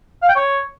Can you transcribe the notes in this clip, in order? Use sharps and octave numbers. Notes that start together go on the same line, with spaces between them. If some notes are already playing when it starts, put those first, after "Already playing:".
F5
G5
C#5